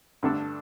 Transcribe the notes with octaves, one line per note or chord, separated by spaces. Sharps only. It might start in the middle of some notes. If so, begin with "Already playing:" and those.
G2 D3 A3 D4 A4